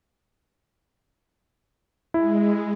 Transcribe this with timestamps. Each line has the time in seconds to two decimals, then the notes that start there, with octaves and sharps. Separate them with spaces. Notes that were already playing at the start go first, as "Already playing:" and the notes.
2.14 G#3 E4